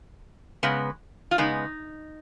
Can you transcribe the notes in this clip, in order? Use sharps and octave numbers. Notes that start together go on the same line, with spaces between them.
C#3 G#3 B3
F4
C#3 G#3 B3 D#4